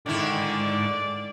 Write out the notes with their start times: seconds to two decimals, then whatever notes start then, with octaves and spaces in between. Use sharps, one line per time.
0.06 C#2 G#2 D3 D#3 E4 D5